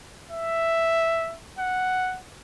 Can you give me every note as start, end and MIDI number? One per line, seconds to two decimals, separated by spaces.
0.31 1.37 76
1.59 2.19 78